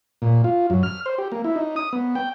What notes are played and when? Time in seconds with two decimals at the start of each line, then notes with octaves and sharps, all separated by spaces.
0.22 A#2
0.44 F4
0.70 F#2
0.83 F6
1.06 C5
1.18 G4
1.32 A#3
1.44 E4
1.56 D#4
1.76 D#6
1.93 B3
2.15 G5